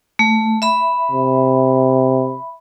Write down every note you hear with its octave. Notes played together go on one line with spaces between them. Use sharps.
A3
E5 B5
C3